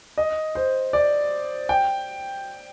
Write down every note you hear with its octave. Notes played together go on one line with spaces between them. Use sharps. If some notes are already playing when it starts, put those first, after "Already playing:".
D#5
C5
D5
G5